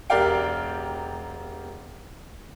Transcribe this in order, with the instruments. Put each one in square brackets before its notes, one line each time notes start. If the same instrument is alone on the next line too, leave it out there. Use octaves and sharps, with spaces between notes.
[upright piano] E1 G4 A#4 D5 F5 G5